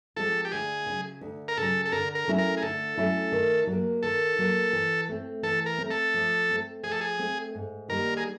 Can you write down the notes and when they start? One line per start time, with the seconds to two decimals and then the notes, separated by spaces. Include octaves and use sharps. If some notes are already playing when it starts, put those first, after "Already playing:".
0.16 F3 G#3 C4 F4 A4
0.45 G4
0.51 D2 G#4
0.86 C#3 F#3
1.21 D2
1.48 A#4
1.58 C#3 F#3 A4
1.85 A4
1.92 D3 A#4
2.15 A#4
2.28 F#3 A3 C#4 E4
2.39 A#4
2.57 G#4
2.62 D3 A4
2.97 F#3 A3 C#4 E4
3.32 D#3
3.67 F#3
3.72 A#3
4.03 D#3 A4
4.39 F#3 A#3
4.73 E3
5.09 A3 C4
5.43 E3 A4
5.66 A#4
5.78 A3 C4
5.91 A4
6.14 F3
6.49 A3 C4
6.83 F3 G#4
6.92 A4
7.01 G#4
7.19 A3 C4
7.55 G#2
7.88 D#3 G3 A#3 A#4
8.17 G#4